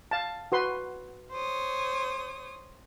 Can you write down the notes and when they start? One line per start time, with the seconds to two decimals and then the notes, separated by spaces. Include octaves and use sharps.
0.11 F5 A5
0.52 F#4 B4 C6
1.31 C5 C#5 D#6